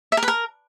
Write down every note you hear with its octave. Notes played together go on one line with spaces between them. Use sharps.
E5
A#4
B4
A#4